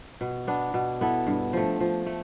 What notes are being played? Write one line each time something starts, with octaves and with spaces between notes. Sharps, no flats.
B2
B3 D4
B2
B3 E4 A4
G2
F3 A3
F3
A3